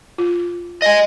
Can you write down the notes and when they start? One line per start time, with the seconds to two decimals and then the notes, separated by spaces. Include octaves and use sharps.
0.18 F4
0.82 D#5 G#5